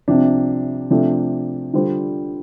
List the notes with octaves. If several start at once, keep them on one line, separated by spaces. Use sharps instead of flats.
C2 C3 F3 D4
C3 F3 A3 D4
D3 G3 F4 C5